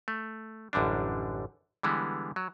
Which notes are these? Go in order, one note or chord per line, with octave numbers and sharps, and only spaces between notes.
A3
A1 F#2 D3 G3 D4
D3 E3 G3 G#3 B3
F#3